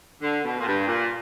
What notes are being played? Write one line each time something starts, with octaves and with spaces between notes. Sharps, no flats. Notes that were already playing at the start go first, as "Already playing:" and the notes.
D3
B2
A#2
G2
A#2